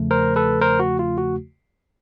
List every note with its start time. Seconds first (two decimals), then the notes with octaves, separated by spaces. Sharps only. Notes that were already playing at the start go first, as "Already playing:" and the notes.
Already playing: E2 C#3 F3 A3
0.11 A#4 C5
0.36 A4 B4
0.61 A#4 C5
0.80 F#4
0.99 F4
1.18 F#4